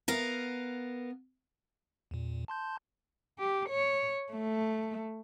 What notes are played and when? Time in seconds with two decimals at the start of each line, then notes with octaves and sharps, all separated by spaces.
0.08 B3 A#4 F5
2.11 E2 A#2
2.48 A5 C6 G6
3.40 G4
3.69 C#5
4.32 A3